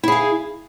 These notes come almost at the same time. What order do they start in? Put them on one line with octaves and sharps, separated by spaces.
E4 G#4 F5